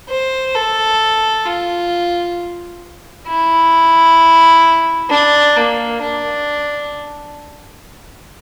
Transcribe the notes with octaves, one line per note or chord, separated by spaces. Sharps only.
C5
A4
F4
E4
D4
A#3
D4